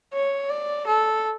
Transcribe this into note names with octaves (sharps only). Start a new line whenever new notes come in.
C#5
D5
A4